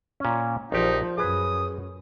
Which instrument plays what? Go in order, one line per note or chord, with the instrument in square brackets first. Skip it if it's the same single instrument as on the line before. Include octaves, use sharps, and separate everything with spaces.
[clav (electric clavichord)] A#2 C#4
[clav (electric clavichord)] A#1 G4 [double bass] F3 [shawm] D#4
[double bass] F#2 [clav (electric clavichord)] G#4 B4 [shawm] D#6